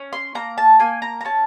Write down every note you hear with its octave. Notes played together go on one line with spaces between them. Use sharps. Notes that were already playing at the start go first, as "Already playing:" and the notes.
Already playing: C#4
C6
A#3 A#5
A5
A#3 G#5
A#5
A#5
C#4 A5